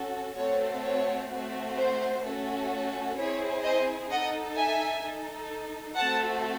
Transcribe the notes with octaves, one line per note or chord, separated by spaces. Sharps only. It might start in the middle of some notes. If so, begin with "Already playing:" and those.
Already playing: C#4 F#4 A4
A3 C4 F#4 A4 C#5
C#5
A3 C4 F#4
C5
A3 C#4 F#4 A4
C4 E4 G#4 C#5
C5 D#5
D#4 A4 D#5 F#5
E5 G#5
D#4 A4
A3 C4 F#4 A4 F#5 A5